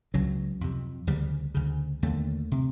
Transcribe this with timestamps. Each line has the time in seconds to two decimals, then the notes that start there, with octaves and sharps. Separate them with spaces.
0.14 C#2 C#3 F#3
0.61 F2 C3
1.07 D2 C#3 G3
1.55 D2 C#3
2.03 D#2 D3 A3
2.52 C3